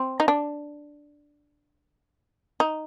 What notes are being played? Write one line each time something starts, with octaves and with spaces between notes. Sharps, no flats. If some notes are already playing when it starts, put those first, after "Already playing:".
Already playing: C4
D#4
D4
D#4